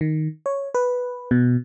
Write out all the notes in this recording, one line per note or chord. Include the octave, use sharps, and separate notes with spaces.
D#3
C#5
B4
B2